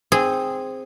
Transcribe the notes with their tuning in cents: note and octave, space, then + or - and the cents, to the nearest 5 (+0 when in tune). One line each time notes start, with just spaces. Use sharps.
C4 +0 G#4 -10